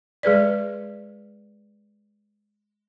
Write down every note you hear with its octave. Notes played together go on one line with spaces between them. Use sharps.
G#3 G#4 B4 D5